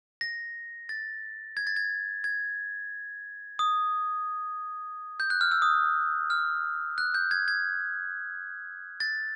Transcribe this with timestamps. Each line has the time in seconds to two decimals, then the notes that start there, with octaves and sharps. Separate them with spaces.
0.21 A#6
0.89 A6
1.57 G#6
1.67 A6
1.76 G#6
2.24 G#6
3.59 D#6
5.20 G6
5.30 F#6
5.41 F6
5.51 E6
5.62 D#6
6.30 F6
6.98 F#6
7.14 G6
7.31 G#6
7.48 G#6
9.00 A6